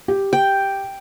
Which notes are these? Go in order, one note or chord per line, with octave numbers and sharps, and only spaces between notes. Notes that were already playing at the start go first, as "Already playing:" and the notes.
G4
G5